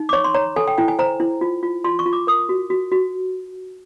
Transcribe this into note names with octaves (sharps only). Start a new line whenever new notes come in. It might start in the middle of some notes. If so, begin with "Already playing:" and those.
Already playing: D#4
D6
C#5 C#6
C6
C#5 A#5
A4 G#5
G5
E4 G5
G#5
C5 A#5
E4
F4
F4
F4 C6
C#6
F4
D6
A#4 D#6
F#4
F#4
F#4